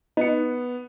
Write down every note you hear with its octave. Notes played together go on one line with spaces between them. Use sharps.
B3 D#4 C#7